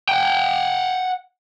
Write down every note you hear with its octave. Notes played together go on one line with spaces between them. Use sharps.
F#5 G5